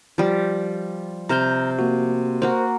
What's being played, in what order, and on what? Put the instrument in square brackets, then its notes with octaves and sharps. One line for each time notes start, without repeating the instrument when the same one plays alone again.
[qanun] F3 G3
[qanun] C3 C5 [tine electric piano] A#5 F6 G6
[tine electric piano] A#3 F#4
[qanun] A#3 F#4 [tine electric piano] A#4 C5